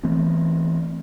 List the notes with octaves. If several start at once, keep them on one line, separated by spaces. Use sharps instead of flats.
E3 A3 B3 C4